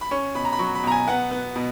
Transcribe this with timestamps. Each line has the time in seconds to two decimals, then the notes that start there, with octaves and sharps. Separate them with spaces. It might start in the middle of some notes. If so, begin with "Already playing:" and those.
0.01 B5
0.11 C#4 C#6
0.35 B2 B5
0.45 A#5
0.52 B5
0.59 F#3 C#6
0.75 B5
0.83 B2 A#5
0.92 G#5
1.07 B3 F#5
1.31 B3
1.56 B2